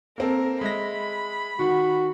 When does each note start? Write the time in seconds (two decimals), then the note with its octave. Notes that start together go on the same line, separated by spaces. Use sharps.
0.18 A#3 C4 A4 A#4
0.61 G#3 E5 B5 A#6
1.59 D#3 F#4 F#5